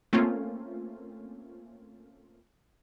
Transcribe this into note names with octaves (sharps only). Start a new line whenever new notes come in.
A3 A#3 C4 C#4 F4